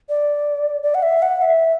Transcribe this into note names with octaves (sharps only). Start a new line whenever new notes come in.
D5
D5
F#5
E5
F#5
E5